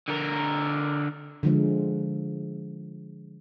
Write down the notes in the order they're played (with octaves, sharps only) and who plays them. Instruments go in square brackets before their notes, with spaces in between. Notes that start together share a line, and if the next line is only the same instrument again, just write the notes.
[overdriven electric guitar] D3 A#4
[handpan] D3 F3 G#3